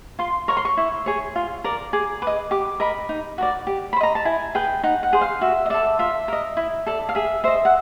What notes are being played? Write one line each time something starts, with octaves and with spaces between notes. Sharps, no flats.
F4 C6
A#4 C#5 C#6
C6
C#6
E4
G#4 C#5
F4
A#4 D5
G#4 D6
B4 D#5 D6
G4 D6
A#4 D#5 B5
D#4
F#4 A#4 D5
G4
C5 B5
D#5 A#5
A5
E4 G#5
G#4 B4 G5
D#4 F#5
F#5
G#4 C5
F5
F#4 E5
D#5
A4 D5 E5
F4 E5
A#4 D#5
E4
A4 D5
F5
G#4 E5
C5 D#5 E5
F#5